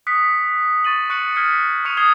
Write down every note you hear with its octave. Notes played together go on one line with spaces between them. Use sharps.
D#6 F#6 B6 C#7
C#6 A6 D#7 F#7
C#6 F#6 C#7 F#7
D#6 F6 G#6 B6 C#7
C#6 D#6 G#6 C#7 D#7 F7
D#6 G#6 C7 C#7 G7